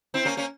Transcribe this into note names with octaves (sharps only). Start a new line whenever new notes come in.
C4 E4
A#3 C#4
A#3 C#4